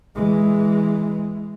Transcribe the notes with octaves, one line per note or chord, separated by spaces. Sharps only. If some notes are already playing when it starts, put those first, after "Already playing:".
E3 G#3